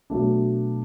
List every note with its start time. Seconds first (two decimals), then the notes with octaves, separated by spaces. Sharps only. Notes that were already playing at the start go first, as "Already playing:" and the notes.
0.10 B2 F#3 A3 D4